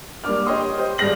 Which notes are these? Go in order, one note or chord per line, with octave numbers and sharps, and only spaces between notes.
G3 A#3 D4 D6 F6
G4 C#5 D#5 G5 C6 D#6
G4 C5 D#5
D#1 G2 G#4 F6 A#6 F#7